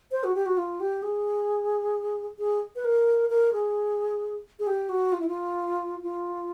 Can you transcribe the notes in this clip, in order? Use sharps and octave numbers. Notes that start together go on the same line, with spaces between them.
C5
F#4
G4
F#4
F4
G4
G#4
G#4
B4
A#4
A#4
G#4
G#4
G4
F#4
F4
E4
F4
F4